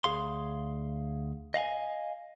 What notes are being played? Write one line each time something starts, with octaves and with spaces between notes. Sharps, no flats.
D2 G#4 F5 C6
D#5 F5 F#5 G#5